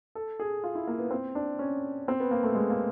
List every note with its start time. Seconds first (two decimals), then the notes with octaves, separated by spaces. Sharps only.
0.15 A4
0.40 G#4
0.64 F4
0.75 E4
0.88 A#3
0.99 B3
1.11 C4
1.35 D4
1.59 C#4
2.08 C4
2.20 B3
2.31 A#3
2.43 A3
2.55 G#3
2.70 A#3